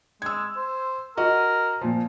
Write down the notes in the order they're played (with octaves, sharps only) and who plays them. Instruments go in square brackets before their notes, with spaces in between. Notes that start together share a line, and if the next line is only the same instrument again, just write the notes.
[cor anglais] G#3 [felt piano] E6 G#6
[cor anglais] C5
[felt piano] F#4 D#5 [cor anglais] A#4
[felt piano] A#2 F3